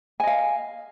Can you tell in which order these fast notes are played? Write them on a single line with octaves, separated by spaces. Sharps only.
G#5 D#5 F5